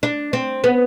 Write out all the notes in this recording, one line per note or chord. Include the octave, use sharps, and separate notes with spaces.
D4
C4
B3